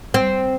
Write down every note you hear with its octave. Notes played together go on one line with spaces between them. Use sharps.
C4